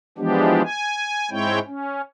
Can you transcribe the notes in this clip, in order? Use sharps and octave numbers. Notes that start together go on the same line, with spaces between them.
E3 F3 G#3 B3 D4 G4
G#5
G#2 G#3 C4 E4 C#5 G5
C#4